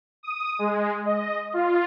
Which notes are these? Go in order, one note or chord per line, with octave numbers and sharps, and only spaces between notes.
D#6
G#3
D#5
F4